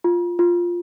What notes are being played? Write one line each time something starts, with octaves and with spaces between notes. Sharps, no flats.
F4
F4